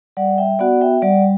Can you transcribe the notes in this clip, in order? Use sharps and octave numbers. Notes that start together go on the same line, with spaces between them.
G3 D5 F#5
E5 G5
B3 F#4 D5 F#5
E5 G5
G3 D5 F#5